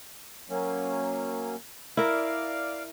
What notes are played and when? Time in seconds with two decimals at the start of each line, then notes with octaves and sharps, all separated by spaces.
0.50 F#3 A#3 C#4
1.97 E4 A#4 D5 F5